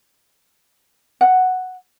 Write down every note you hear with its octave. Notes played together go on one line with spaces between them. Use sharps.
F#5